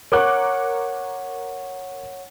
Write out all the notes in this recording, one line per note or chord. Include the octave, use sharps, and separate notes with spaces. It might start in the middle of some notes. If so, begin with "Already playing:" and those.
A#4 C#5 F#5 C#6 D6 F#6